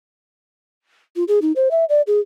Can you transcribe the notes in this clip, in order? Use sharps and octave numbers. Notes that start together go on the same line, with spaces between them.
F4
G#4
D#4
C5
E5
D5
G#4